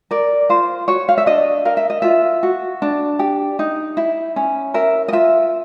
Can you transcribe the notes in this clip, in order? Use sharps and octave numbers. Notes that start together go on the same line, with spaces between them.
A#4 D5
F4 C5
F#4 C#5
F5
E5
D4 D#5
A#4 F5
E5
D#5
F4 E5
F#4
D4
G4
D#4
E4
C#4
A#4 E5
D#5
F4 E5